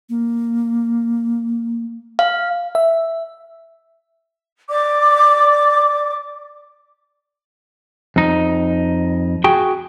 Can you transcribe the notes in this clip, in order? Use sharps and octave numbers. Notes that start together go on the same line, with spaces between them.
A#3
F5
E5
D5 D6
F2 D#4
F#4 G#4 G5